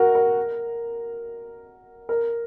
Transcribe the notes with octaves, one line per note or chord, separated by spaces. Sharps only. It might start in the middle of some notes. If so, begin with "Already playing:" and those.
Already playing: F#4 A#4
A#4
A#4